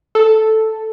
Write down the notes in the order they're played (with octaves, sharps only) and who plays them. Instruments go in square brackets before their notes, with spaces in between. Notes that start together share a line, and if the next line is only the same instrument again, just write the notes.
[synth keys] A4